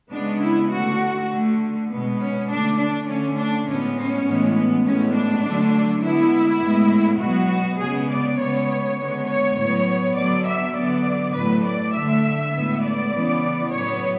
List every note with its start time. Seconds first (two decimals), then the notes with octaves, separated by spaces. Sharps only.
0.11 C#3 G#3 B3 D4
0.41 E4
0.71 D3 A3 F#4
1.30 D3 A3
1.88 B2 G#3 B3
2.19 C#4
2.49 D3 A3 D4
2.77 D4
3.08 D3 A3 C#4
3.37 D4
3.67 A2 G#3 B3 C#4
3.96 C#4
4.25 A2 E3 G#3 B3
4.55 B3
4.85 A2 G#3 B3 C#4
5.14 D4
5.44 D3 F#3 A3
6.03 D3 G#3 B3 E4
6.62 A2 G#3 B3
7.21 B2 F#3 B3 F#4
7.80 C#3 G#3 B3 G#4
8.10 D5
8.39 C#3 G#3 B3 C#5
8.99 D3 G#3 B3
9.28 C#5
9.57 A2 F#3 B3 C#5
10.16 D3 F#3 B3 D5
10.47 E5
10.76 D3 F#3 B3 D5
11.35 A2 F#3 A3 B4
11.65 D5
11.94 D3 A3 E5
12.53 A2 G#3 B3
12.84 D5
13.12 C#3 E3 B3
13.71 A2 F#3 B3 C#5